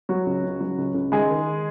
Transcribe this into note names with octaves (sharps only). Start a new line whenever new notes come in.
F#3 F#4
C#2
C#3
F#3
C#2
C#2
D#3 G#3 G#4
D#3